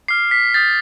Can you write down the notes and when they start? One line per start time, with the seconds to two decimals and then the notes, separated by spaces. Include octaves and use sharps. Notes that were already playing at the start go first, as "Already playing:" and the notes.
0.08 D6 F6 C7
0.31 B6
0.54 D#6 G6 A6